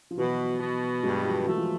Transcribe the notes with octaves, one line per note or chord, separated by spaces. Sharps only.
F3
B2 E3 F#3
B2
G2 F#3 G#3
F3 G3
E3 F#3 A3
F3